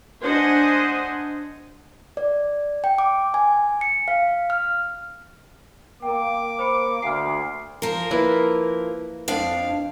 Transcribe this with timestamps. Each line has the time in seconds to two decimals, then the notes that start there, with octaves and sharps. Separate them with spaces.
0.22 D4 C5 D#5 F#5 G#5
2.17 D5
2.84 G5
2.98 D6
3.34 G#5
3.81 C#7
4.08 F5
4.50 F6
6.02 A#3 A#4 G5 D6
6.59 C5 B5 C#7
7.02 D2 F6 C7
7.82 F3 A#4
8.11 A#3 E4 B4
9.28 F2 D4 F5